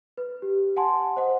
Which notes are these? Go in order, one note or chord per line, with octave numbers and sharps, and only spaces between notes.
B4
G4
F#5 G#5 A5 C6
C5 D#5 F#5